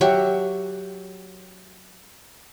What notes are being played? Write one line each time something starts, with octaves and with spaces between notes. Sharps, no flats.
F#3 F#4 G4 E5